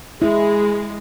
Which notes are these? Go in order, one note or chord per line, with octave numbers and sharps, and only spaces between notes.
G#3 E4 G#4